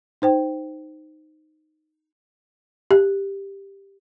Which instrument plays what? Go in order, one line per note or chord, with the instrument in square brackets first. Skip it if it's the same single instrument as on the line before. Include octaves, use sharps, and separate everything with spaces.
[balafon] D#4 C5 G5
G4